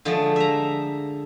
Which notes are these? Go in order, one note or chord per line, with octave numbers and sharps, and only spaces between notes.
D3 F3 G#3 A3
E5 A#5